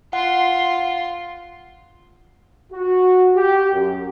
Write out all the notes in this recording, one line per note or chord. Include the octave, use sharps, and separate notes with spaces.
F4 F#5 C6
F#4
G4
F#2